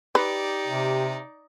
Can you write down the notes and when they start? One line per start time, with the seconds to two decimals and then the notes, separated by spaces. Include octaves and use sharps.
0.15 D#4 G4 B4 D5
0.67 C3